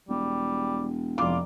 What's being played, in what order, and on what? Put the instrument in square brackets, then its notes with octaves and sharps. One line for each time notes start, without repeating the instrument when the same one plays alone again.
[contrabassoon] E1 [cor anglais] G3
[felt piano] F1 D6 [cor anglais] F4